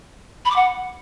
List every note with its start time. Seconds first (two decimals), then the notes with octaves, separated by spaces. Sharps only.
0.45 B5
0.50 D6
0.55 F#5